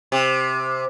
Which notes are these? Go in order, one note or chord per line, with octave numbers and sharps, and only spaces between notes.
C3